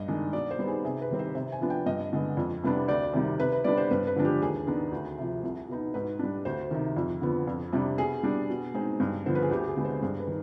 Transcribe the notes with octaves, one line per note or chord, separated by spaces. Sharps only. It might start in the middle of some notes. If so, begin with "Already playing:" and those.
Already playing: G2 D#5
D#3 G#3 D4
B2 D5
C5
G3 B3 D#4
G#4
C3 G#4
B4
D#3 G3 C4
C5
C3 C5
G#5
F3 B3 D4
G5
G2 D#5
D3 G#3 B3
F2
C3 G3 B3 D4
D2 D5
C3 D#3 G3
C3 B4
B4
G3 B3 D4 D5
C5
G2 B4
B4
D3 F3 G#3 D4
G4
D#2 G#4
D#3 B3 D4
D2
C3 F3
C2
B2 B3 D#4
G#2 B4
G3 D4
D2 C5
C3 D#3
F2
D3 F3 B3
F2
C3 G3 D4
B2 G#4
G3 D4
B2
G#3 C4 D#4
G2
D3 F3 B3 C5
B4
G#4
D2 G4
G#4
D3 G#3 B3
C5
G2 G#4
B4
D#3